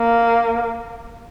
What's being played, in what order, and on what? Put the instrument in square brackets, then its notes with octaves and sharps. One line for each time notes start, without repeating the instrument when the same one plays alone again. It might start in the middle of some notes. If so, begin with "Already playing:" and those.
Already playing: [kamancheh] A#3